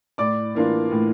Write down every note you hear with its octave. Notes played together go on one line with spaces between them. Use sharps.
A2 D5 D6
E3 A#3 D4 F4
A2